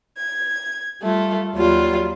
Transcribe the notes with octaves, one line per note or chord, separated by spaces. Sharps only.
G#6
G3 A3 F4
D#2 F#3 G3 F4